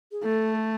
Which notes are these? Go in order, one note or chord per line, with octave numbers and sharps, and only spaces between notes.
G#4
A3 A4